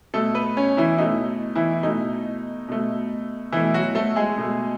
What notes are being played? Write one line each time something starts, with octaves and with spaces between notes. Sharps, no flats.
B2 A3 A4
B3 B4
C#4 C#5
E3 E4
B2 A3 D#4
E3 E4
B2 A3 D#4
B2 A3
B2 E3 A3 E4
F#3 F#4
A3 A4
G#3 G#4
B2 A3